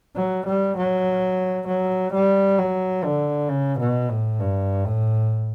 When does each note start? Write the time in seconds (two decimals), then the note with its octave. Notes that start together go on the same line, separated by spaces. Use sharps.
0.16 F#3
0.46 G3
0.77 F#3
1.67 F#3
2.13 G3
2.58 F#3
3.04 D3
3.49 C#3
3.79 B2
4.09 A2
4.39 G2
4.85 A2